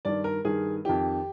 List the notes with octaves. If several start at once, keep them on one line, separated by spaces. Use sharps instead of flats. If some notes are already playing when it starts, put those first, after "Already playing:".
G2 D#3 D5
A#4
G2 D#3 G#4
F2 D#3 G4